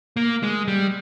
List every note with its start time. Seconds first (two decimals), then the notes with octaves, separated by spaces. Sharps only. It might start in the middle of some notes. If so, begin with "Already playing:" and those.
0.17 A#3
0.43 G#3
0.68 G3